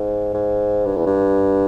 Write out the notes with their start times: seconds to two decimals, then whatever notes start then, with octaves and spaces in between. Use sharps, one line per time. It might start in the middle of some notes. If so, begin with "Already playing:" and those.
Already playing: G#2
0.34 G#2
0.86 G2
0.96 E2
1.07 G2